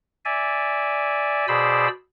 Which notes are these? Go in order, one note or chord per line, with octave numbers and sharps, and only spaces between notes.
D5 E5 G#5
B2 G#4 C5 D5 B5 E6